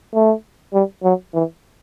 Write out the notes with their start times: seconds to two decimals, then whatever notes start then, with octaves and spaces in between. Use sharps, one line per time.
0.14 A3
0.73 G3
1.03 F#3
1.34 E3